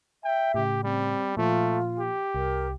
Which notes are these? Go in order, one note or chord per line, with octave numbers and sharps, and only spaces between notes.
E5 G5
A2 C#3 G4
G3 C4
A#2 F3 A3 F4
G4
C2 A#4